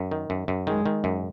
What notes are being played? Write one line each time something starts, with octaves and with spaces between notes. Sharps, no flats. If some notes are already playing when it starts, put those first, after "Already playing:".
Already playing: F#2
D#3
F#2
F#2
D#3 G#3
D#3
F#2